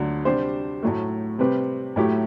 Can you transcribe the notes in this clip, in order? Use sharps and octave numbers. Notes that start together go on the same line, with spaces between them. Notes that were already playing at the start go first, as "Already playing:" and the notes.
Already playing: D2 D3 F#3
C3 G3 D4 G4 C5
A2 F#3 A3
C3 G3 C4 G4 B4
A2 F#3 A3 E4 G4